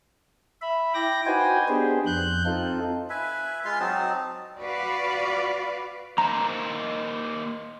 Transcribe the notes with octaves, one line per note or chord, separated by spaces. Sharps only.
E5 B5
E4 G5 D6 A#6
D#4 F#4 B4 C5 G5 G#5
B3 D4 G4 G#4 C5
F2 F#6 G6
C4 D#4 F4 A4
B4 E5 G#5
G#3 F4 F5 C6
F#3 C4 D#4 A5
F#4 B4 D5 F5
A#3 D#4 C5 A#5